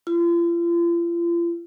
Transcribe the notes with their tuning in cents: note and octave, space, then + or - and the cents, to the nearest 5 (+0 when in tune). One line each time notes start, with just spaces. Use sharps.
F4 -40